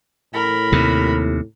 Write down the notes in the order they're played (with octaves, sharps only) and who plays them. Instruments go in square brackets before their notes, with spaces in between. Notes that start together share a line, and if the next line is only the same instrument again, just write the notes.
[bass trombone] A2 [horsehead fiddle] A#4 B5
[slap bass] D#2 C3